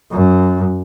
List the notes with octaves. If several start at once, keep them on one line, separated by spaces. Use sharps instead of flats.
F#2